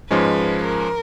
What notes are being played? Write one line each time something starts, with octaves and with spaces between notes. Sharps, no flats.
G#2 F3 G#3 C#4 B4
A#4